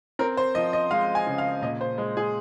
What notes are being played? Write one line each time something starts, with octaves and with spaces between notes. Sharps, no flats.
C4 A#4
C5
F3 D#5
D#5
G#3 F5
G#5
C#3
F5
A#2 D#5
C5
G#3
G#4